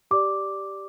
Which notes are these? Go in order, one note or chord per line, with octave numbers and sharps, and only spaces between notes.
G4 D5 D6